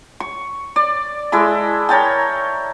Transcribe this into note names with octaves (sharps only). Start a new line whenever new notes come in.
C#6
D5
G#3 E4 A4
A#4 C#5 G5 A5